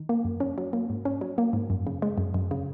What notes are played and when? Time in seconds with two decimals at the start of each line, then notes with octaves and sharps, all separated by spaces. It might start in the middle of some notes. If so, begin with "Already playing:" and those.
Already playing: D#3
0.09 A#3
0.25 F#2
0.40 C#4
0.58 F#3
0.73 A#3
0.90 G#2
1.05 C#4
1.21 F#3
1.38 A#3
1.53 G#2
1.70 F#2
1.87 C#3
2.02 G#3
2.18 F#2
2.34 F#2
2.51 C#3